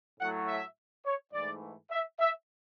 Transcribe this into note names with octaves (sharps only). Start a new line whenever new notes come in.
A2 F#3 A3 F#5
E5
C#5
G#2 E3 A3 D5
E5
E5